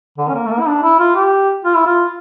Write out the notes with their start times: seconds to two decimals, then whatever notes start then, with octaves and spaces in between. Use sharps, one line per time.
0.18 D3
0.29 C#4
0.35 A#3
0.46 A3
0.51 A#3
0.60 E4
0.67 D4
0.83 E4
0.99 F4
1.15 G4
1.65 F4
1.76 E4
1.87 F4